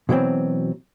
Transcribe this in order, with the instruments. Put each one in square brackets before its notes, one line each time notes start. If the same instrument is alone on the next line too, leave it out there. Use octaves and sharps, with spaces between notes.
[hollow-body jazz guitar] B2 E3 F#3 C4